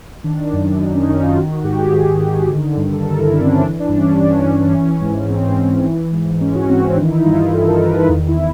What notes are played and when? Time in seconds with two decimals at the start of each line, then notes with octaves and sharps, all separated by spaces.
0.24 D#3 D4
0.53 F#2
0.80 F#2 D#4
0.94 C#4
1.08 D#3 D#4
1.23 F4
1.37 D#3 F#4
1.51 F#4
1.64 G#2 G4
1.79 G#4
1.93 G#2
2.21 D#3
2.49 D3
2.76 G2
2.93 A4
3.04 G2 A#4
3.19 E4
3.32 D3 D4
3.40 C4
3.46 C#4
3.61 E3 D4
3.80 D4
3.89 G2
3.97 C#4
4.12 D4
4.17 G2 C#4
4.31 C#4
4.44 E3
4.58 C#4
4.73 E3 C#4
5.01 G#2
5.29 G#2 C4
5.57 E3
5.85 E3
6.13 G#2
6.41 G#2 C#4
6.55 F#4
6.69 E3 C4
6.83 C#4
6.96 D#3 D4
7.06 E4
7.10 D#4
7.19 E4
7.24 G2 F4
7.53 G2 A4
7.67 A#4
7.81 D#3 B4
7.95 A4
8.09 E2 F4
8.28 E4